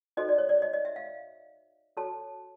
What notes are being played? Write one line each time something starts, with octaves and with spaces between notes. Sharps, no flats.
D#4 F#4 A4 C5 D#5
D5
C#5
D5
D#5
D#5
E5
F5
F#4 A4 C#5 A5